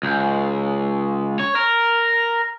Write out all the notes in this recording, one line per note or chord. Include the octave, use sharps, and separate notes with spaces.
C#2
C#5
A#4